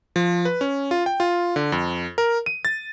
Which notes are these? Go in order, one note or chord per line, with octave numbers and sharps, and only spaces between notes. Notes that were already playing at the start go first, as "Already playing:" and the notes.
F3
B4
C#4
F4
G5
F4
D3
F2
A#4
D#7
A6